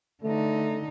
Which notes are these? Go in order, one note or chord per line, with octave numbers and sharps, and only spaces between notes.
D3 A3 D#4